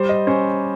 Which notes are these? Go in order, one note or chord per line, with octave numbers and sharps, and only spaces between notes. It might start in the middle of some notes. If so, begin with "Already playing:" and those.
Already playing: G3 C5
D#5
C#4 C5